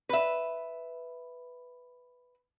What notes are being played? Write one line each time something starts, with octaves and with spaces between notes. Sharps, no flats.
B4 E5